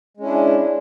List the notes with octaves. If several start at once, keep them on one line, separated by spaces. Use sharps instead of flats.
G#3 C#4 D4 E4